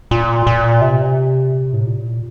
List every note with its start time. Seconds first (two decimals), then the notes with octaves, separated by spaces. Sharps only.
0.11 A#2
0.47 A#2
0.81 C3
1.73 A2
1.86 A#2